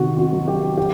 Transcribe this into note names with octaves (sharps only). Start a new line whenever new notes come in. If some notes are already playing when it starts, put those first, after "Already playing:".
Already playing: C3 D#3 F#4
F#4
F#3
G4
G4